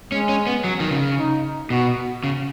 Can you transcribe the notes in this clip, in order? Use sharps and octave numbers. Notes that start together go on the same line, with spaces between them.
G#3 C#4
C#4
B3
F#3
D#3
C#3
D#4
B2 F#4
C#3